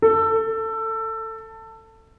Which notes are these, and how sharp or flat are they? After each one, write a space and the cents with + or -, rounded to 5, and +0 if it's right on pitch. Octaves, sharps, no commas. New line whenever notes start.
A4 +20